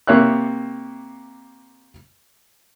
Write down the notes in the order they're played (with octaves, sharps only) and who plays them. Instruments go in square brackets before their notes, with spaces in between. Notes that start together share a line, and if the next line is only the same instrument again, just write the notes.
[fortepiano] C3 A#3 C#5 E5 F#6